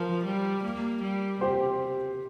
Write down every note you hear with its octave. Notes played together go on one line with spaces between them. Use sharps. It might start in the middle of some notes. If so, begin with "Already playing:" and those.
Already playing: F3 A#4
G3
A#3
G3
C3 G4 C5